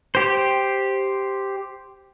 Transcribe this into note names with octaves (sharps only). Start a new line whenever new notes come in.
G4 C5